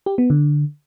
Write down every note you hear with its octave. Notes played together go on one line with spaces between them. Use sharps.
G4
B3
D3